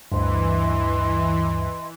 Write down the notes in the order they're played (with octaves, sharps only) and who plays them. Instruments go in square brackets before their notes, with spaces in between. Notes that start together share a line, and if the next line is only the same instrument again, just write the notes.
[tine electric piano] D2 G2 [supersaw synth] E3 [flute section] D#5 C6